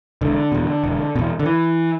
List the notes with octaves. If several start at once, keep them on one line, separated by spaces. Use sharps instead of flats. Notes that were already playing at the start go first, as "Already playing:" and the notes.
E1 D3
E2 B2
E1
E2 B2
D3
E3